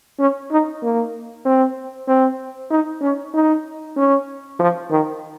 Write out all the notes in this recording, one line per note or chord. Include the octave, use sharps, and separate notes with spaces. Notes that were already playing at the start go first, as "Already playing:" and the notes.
C#4
D#4
A#3
C4
C4
D#4
C#4
D#4
C#4
F3
D#3